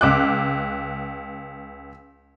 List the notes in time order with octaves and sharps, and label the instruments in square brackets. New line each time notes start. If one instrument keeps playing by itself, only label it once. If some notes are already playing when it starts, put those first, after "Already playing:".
[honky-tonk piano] C#2 D6 F#6